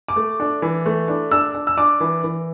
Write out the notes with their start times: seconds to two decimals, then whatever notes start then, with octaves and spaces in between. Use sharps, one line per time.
0.08 D6
0.16 A3
0.40 D4
0.62 E3
0.86 A3
1.08 D4
1.31 D4 E6
1.54 D4
1.67 E6
1.77 D4 D6
2.00 E3
2.24 E3